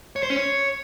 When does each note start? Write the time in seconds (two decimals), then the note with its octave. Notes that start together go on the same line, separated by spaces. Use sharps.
0.16 C#5
0.23 C5
0.30 C#4
0.37 C#5